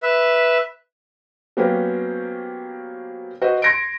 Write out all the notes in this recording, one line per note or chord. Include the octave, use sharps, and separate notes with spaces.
B4 E5
F#3 A#3 B3 C#4 G4 C5
F#4 B4 C5 D#5
C6 G#6 A#6 C#7 D7